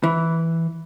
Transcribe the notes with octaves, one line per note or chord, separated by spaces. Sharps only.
E3